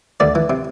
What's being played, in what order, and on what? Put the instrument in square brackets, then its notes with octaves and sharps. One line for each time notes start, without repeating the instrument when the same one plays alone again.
[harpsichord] D2 D5
E3
C3